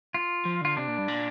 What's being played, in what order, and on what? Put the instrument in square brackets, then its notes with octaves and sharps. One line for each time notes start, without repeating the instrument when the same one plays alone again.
[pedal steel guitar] F4
[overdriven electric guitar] F3
[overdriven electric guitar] D3 [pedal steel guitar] F4
[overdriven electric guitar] C3 [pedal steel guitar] D4
[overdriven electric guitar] A#2
G2
A#2